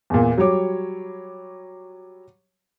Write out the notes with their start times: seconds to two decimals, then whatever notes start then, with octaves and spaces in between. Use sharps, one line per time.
0.10 E2 A#2
0.38 F#3 G3 C#5 D6